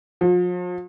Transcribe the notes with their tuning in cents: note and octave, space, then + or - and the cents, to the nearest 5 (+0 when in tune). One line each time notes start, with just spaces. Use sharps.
F3 +40